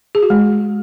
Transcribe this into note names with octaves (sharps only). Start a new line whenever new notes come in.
G#4
F#4
G#3